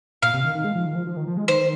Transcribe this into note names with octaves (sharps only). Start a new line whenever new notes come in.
A#2 F5
C3
D#3
D#3
G#3
F3
D#3
F3
F3
D#3
F3
G#3
D#3 C5